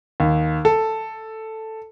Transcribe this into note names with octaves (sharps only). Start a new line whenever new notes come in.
D#2
A4